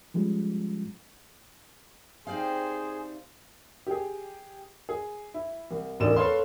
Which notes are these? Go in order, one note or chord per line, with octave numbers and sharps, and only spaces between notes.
F3 G3 G#3 C#4 F4
C3 D#4 G#4 C5 D5 F5 G5
G4 G#4
G#4
E4
C2
E1 A1 D2 D#3 D5 E7
A4 B4 C#5 F5 C6